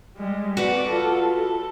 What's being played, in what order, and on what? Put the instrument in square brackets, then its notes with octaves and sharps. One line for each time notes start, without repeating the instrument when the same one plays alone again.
[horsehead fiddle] G3 G#3
[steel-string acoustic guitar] F#4 B4 F#5 [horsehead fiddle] D5
[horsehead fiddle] F4 A4
A4